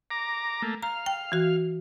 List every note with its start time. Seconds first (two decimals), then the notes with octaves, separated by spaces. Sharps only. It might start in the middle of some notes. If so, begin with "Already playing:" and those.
0.11 A#5 D6
0.62 A3 A#3
0.82 F5 A#5
1.06 G5
1.32 E3 F#4